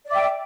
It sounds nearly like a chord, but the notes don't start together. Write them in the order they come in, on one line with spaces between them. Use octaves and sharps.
D5 D6 E5 G5